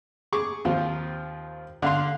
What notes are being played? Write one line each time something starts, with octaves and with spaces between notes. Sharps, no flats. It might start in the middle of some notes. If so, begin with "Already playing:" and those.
G#4 C#6 D6
D#2 F3 C4 F4
D3 F5 C6